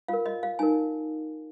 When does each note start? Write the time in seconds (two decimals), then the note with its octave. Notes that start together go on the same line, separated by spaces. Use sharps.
0.08 F4 A#4 F5
0.26 D#5
0.43 F5
0.59 D#4 A#4 G#5